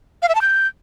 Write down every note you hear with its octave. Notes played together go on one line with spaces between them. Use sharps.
F5
E5
A5
G6